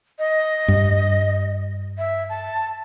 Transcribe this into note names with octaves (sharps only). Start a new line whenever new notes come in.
D#5
G2
E5
A5